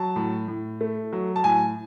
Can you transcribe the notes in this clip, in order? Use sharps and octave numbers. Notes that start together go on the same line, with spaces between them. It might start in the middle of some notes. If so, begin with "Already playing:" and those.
Already playing: F#3 A5
A2
A2
A3
F#3
A5
A2 G#5